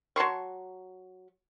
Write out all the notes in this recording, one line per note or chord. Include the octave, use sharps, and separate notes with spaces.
F#3 A5 C6 C#6